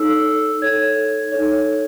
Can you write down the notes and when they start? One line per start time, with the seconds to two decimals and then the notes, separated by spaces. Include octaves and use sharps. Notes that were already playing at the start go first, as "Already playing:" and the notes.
Already playing: D#4 A4 C#5 E6
0.62 D#4 A4 C#5 G#6
1.32 D#4 A4 C#5